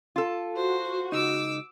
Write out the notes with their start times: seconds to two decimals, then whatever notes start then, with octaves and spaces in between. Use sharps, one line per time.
0.16 F4 A4
0.56 F#4 C5
1.12 C#2 D#4 D6 E6